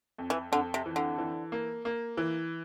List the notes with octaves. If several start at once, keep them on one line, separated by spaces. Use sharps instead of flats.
F2
E3
F2 D3
C3
E3
D3
E3
A#3
A#3
E3